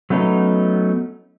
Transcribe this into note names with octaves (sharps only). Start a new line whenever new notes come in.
F#3 A3 B3 C#4 D#4